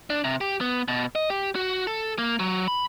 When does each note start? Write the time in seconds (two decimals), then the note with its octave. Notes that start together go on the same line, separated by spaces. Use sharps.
0.10 D4
0.24 C3
0.41 G4
0.61 B3
0.88 B2
1.15 D#5
1.30 G4
1.55 F#4
1.87 A4
2.18 A#3
2.40 F#3
2.68 B5